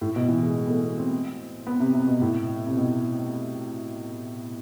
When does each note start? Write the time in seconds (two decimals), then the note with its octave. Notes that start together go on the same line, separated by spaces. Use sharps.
0.01 A2
0.16 B2
0.29 E3
0.43 G#3
0.56 G#3
0.67 B3
0.70 A3
0.84 B3
0.98 C4
1.67 B3
1.80 C3
1.94 C3
2.08 B2
2.22 A2
2.66 C3
2.77 B2